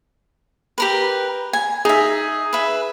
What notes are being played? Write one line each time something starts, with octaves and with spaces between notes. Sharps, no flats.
G4 A#4 B4
G#5
D#4 G#4 E5
B4 E5